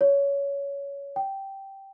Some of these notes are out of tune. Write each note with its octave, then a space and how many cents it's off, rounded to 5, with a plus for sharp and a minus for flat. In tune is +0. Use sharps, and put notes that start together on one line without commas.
C#5 +15
G5 -5